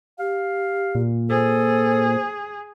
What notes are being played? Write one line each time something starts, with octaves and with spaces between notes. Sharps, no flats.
G4 F5
A#2
G#4 A4 C5